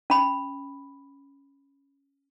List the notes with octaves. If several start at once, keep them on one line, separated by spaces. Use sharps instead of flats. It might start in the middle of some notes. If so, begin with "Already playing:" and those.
C#4 B5